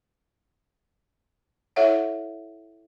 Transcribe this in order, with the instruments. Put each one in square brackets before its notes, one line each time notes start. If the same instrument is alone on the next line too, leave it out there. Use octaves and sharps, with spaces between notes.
[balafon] E4 A4 C#5 E5 F#5